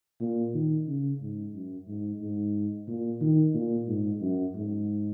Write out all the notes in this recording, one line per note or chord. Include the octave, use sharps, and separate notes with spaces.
A#2
D#3
C#3
G#2
F#2
G#2
G#2
A#2
D#3
A#2
G#2
F#2
G#2